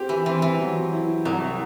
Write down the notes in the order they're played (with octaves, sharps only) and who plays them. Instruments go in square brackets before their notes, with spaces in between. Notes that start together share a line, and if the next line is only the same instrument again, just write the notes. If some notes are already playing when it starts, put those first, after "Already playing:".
Already playing: [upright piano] C4 G4
[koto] E3
[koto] E3 [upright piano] C4
[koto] E3
[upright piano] F#3
E4
[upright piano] C2 [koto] F#3